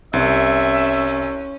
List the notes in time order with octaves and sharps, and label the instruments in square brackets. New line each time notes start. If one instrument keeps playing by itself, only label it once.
[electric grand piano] C2 [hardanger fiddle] C#4 [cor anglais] E5